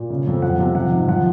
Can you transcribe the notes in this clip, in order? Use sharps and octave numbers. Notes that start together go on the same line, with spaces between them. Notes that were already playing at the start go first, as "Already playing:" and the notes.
Already playing: A#2
C#3
F2
F3 F#5
C3
F3 F#5
G#2
F3 F#5